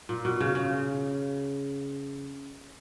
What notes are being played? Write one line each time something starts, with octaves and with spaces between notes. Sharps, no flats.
A#2
B2
C#3
C#3